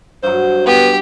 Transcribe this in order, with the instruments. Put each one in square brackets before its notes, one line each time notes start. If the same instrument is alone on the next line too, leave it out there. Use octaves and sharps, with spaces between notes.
[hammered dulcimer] G2 F#3 [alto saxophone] C5
[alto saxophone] B3 [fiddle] G4